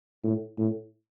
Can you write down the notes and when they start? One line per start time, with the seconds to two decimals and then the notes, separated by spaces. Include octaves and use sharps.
0.24 A2
0.58 A2